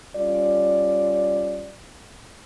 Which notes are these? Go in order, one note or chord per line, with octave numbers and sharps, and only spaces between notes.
G3 C#4 F4 D5